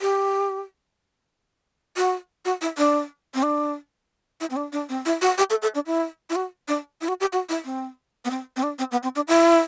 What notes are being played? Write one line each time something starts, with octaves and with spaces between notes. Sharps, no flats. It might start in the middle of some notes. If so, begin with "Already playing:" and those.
G4
F#4
F#4
E4
D4
C4
D4
E4
C4
D4
D4
C4
E4
F#4
G4
A4
A4
D4
E4
E4
F#4
D4
E4
F#4
G4
F#4
E4
C4
B3
C4
C4
D4
C4
B3
C4
D4
E4